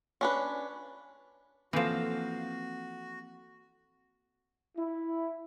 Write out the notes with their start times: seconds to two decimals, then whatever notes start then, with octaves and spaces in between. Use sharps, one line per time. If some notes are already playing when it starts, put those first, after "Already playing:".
0.21 C#4 D4 B4
1.73 E3 F3 A#3 C4 F#4 A4
4.76 E4